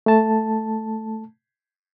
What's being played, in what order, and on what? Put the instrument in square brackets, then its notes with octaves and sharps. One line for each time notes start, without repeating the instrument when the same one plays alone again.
[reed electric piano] A3 A5